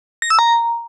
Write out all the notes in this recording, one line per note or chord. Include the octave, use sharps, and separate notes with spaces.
A#6
E6
A#5